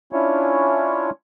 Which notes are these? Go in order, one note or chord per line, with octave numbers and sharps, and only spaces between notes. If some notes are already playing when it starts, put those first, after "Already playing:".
C#4 D4 E4 F4 C#5